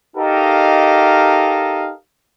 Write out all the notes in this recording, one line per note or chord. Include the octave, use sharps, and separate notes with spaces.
D#4 G4 A4 A#4 D#5 F5